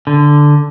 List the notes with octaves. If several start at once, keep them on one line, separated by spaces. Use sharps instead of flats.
D3